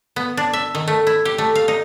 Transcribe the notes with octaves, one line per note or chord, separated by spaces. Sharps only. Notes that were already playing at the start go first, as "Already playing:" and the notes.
B3
D4
E5
D#3
A3
E4
G4
A3
F5
D#4